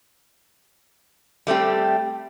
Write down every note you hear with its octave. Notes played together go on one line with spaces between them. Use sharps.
G3 A3 C4 G4